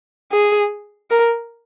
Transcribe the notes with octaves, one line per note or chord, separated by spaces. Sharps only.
G#4
A#4